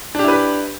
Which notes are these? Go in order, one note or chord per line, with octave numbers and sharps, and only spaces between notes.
D4 E4 G4 B4